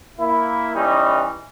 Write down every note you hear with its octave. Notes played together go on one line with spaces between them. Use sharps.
A#3 E4
E3 G3 C#4 D#4